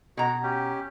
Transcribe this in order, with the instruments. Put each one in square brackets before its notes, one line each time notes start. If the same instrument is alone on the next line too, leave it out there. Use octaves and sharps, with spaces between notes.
[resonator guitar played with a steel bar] B2 A#5 [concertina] F#4
[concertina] C#4 G4